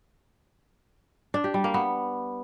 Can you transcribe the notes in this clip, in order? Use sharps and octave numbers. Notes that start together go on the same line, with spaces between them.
D4
G4
G3
A#3
B3